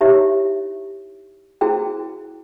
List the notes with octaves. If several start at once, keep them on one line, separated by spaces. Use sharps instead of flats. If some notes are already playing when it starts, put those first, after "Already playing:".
D#4 E4 G4 C#5 E5
E4 F#4 G#4 C5 G5